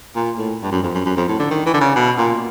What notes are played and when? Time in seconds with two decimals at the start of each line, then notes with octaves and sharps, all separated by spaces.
0.16 A#2
0.38 A2
0.63 G2
0.72 F#2
0.83 F2
0.95 F#2
1.06 F#2
1.17 F2
1.28 A2
1.39 D3
1.51 D#3
1.66 E3
1.74 D3
1.81 C#3
1.96 B2
2.18 A#2